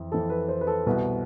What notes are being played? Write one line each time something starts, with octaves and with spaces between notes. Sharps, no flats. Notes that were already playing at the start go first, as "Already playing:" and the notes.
Already playing: F2 E3
F2 E3 A4
B4
C5
B4
A4
C2 B2 B4